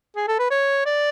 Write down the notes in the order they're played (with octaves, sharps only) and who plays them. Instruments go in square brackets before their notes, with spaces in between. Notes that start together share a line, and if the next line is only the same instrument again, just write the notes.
[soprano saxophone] G#4
A4
B4
C#5
D5